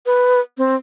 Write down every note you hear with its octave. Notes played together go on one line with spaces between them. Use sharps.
B4
C4